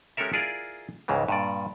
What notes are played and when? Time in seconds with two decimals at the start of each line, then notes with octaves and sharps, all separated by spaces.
0.17 G#3 C#4 G4 A4 A#4 E5
0.33 E4 F4 G#4 A#4 D5
1.08 C#2 G#2 C#3 E3
1.28 G2 A#2 D5